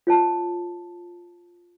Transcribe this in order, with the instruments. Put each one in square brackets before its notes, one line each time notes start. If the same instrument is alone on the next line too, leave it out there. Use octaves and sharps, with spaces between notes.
[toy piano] F4 C#5 A5